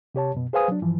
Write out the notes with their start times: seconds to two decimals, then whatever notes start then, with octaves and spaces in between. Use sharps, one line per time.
0.15 C3 G4 C#5 A5
0.34 F#2 B2
0.53 G#4 B4 C5 F5 G#5 D#6
0.68 F#3 D4
0.82 G2 E3 F3